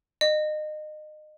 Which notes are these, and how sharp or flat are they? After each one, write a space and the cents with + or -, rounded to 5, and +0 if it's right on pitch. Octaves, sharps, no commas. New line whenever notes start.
D#5 -30